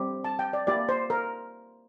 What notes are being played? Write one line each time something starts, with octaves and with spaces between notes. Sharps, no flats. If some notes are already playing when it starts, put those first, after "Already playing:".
Already playing: G3 C4 E4 G4
A5
G5
D5
A#3 E4 G4 D5
C5
A#4